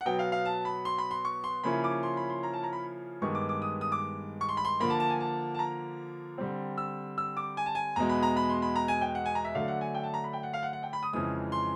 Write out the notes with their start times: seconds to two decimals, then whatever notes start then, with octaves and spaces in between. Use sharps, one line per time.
0.01 F#5
0.05 B2 F#3 B3 G5
0.19 F5
0.32 F5
0.45 A5
0.65 B5
0.85 C6
0.98 B5
1.11 C6
1.25 C#6
1.44 C6
1.64 C#3 F3 A#3 C#4 E4 B5
1.84 D6
2.03 C6
2.17 B5
2.30 C6
2.43 A#5
2.53 A5
2.63 A#5
2.73 B5
3.22 G2 D#3 G#3 B3 C#6
3.35 D6
3.49 D6
3.62 D#6
3.81 D#6
3.92 D6
4.41 C#6
4.49 C6
4.57 B5
4.65 C6
4.80 D3 F3 A#3 B5
4.90 A5
5.00 A5
5.10 G#5
5.20 A5
5.54 A5
5.59 A#5
6.38 D3 G3 C4
6.78 E6
7.18 E6
7.37 D6
7.57 G#5
7.66 A5
7.75 G#5
7.96 E2 B2 G#3 A#5
8.09 B5
8.23 A#5
8.36 B5
8.50 C6
8.62 B5
8.76 A#5
8.88 G#5
9.01 G5
9.15 F#5
9.26 G#5
9.35 A#5
9.45 E5
9.54 D3 F#3 A3 D4 F5
9.68 F#5
9.81 G#5
9.94 G5
10.03 A5
10.14 A#5
10.24 B5
10.33 G5
10.43 F#5
10.53 F5
10.63 F#5
10.73 F#5
10.83 G5
10.93 B5
11.03 D#6
11.13 F2 C#3 E3 G#3 D#6
11.52 C6